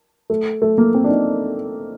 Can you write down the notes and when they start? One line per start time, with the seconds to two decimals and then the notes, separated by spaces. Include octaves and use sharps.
0.30 A3
0.62 A3
0.78 A#3
0.94 C4
1.04 D4
1.09 D#4